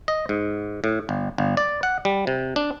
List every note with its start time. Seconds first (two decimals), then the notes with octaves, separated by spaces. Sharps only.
0.08 D#5
0.29 G#2
0.84 A2
1.09 G1
1.38 G1
1.57 D5
1.83 F#5
2.05 G3
2.27 C3
2.56 D4